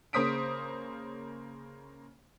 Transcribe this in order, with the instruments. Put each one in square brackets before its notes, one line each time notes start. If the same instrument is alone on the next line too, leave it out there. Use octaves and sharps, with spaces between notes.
[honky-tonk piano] C#3 A#3 C5 D#6 B6 D7